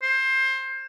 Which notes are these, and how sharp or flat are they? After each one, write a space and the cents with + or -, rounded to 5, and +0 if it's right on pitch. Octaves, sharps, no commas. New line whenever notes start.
C5 +20